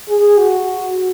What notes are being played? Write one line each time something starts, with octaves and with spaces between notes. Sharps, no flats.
G#4
F#4